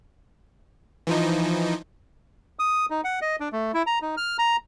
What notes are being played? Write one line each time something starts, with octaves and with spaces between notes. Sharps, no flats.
E3 F3 D#4
D#6
D#4
F#5
D#5
D4
A3
E4
A#5
D#4
F6
A#5